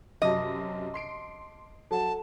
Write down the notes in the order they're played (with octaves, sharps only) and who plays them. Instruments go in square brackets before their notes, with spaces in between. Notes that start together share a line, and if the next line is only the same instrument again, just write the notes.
[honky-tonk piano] F#2 C3 F#3 [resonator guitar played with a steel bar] D#5 [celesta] A5 D6
[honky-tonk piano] C6 C7 D7
[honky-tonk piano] F#3 [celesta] A4 F#5 [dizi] A5